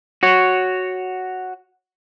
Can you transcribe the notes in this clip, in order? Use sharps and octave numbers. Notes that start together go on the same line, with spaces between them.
F#4 C#5